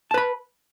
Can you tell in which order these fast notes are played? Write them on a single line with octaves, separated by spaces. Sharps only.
A5 B4 B5